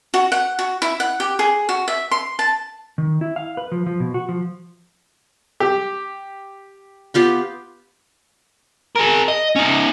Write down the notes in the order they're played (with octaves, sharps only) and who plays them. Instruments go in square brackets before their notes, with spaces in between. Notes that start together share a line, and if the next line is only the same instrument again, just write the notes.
[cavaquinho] F#4
F#5
F#4
E4
F#5
G4
G#4
F#4
E5
C6
A5
[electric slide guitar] D#3
E4
F5
B4
F3
F3
B2
F#4
F3
[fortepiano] G4
[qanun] B3 F4 G4
[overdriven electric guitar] G#4 A#4
D#5
C#4 D#4